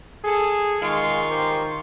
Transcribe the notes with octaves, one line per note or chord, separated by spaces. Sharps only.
G#4 A4
D#3 G#3 F4 F5 C#6
G4 A#4 C5